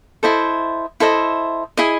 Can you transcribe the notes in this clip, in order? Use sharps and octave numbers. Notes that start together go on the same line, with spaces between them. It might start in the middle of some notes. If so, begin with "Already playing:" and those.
E4 A4 C5 D#5
E4 A4 C5 D#5
E4 G#4 D#5